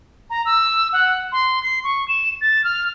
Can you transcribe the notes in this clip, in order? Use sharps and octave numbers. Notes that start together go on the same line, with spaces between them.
A#5
E6
F#5
C6
C7
C#6
E7
A6
F6